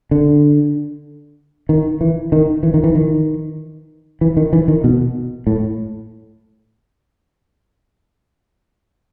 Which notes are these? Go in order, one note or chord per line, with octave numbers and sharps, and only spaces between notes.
D3
D#3
E3
D#3
E3
D#3
E3
D#3
E3
D#3
E3
D#3
B2
A2